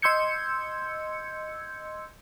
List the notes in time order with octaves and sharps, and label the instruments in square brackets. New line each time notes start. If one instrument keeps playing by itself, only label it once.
[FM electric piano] D#5 C6 E6 G6 G#6 C#7